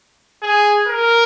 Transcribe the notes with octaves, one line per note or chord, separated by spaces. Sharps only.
G#4
A#4